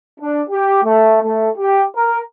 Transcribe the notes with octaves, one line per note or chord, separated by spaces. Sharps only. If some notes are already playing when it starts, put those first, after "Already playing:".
D4
G4
A3
A3
G4
A#4